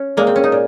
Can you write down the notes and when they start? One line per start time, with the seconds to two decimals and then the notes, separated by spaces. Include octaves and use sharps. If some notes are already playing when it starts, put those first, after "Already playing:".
Already playing: C#4
0.17 A#2 G#3 A#3
0.27 C4
0.36 C#4
0.44 D#4
0.52 A#2